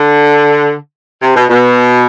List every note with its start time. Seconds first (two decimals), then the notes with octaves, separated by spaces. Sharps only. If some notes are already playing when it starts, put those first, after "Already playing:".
Already playing: D3
1.22 C3
1.34 B2
1.48 B2